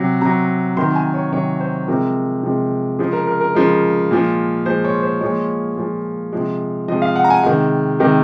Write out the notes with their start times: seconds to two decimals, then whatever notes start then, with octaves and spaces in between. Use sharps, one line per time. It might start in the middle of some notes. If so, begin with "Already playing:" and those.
Already playing: C3 F#3
0.21 C3 F#3 A#5
0.77 C3 D#3 F#3 C6
0.95 G#5
1.14 C#5
1.32 C3 D#3 F#3 C#5
1.60 C5
1.88 C3 F3 G#3 A#4
2.43 C3 F3 G#3
2.99 C#3 F3 G#3 G#4
3.13 A#4
3.27 A#4
3.41 A#4
3.55 C#3 F3 G#3
4.11 A#2 F3 G#3
4.66 A#2 F3 G#3 C5
4.85 C#5
5.03 C5
5.21 A#2 F3 G#3 C#5
5.77 A#2 F3 G#3
6.33 C3 F3 G#3
6.88 C3 F3 G#3 D#5
7.02 F5
7.16 F#5
7.24 A#5
7.30 G#5
7.43 C3 D#3 G#3
8.00 C3 D#3 G#3